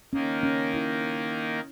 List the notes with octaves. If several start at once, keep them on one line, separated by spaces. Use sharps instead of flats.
D#3 A#3 C#4 D#4 A#4
C#4
E4